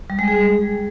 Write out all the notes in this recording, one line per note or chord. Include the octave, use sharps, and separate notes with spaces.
G3
G#3
G#4